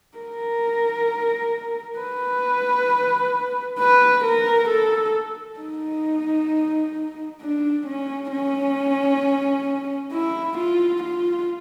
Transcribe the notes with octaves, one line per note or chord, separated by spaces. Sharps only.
A#4
B4
B4
A#4
A4
D#4
D4
C#4
C#4
E4
F4
F4